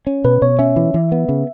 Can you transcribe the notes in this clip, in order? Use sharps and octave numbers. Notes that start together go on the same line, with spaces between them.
C#4
B2 B4
B2 C#5
C#4 E5
E3
E3
B3
C#3